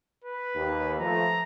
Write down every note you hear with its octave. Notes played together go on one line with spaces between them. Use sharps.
B4
D#2
F3 A3 A#5